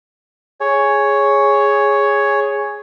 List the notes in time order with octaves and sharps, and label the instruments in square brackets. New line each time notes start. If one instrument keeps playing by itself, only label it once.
[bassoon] G#4 [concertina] C#5